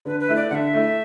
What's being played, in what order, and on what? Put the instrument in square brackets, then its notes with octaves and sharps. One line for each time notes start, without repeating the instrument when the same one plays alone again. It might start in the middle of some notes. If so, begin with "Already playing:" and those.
[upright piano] D3 [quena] B4
[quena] B4
[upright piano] A3 E4
[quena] D5
[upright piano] D3 [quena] E5 F#5
[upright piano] A3 E4